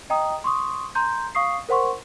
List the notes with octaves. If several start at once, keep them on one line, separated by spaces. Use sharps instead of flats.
D#5 G5 A#5 D#6
C6 C#6 D#6
A#5 C6 G6
F5 C#6 D#6 C7
A#4 C5 F#5 C6 C#6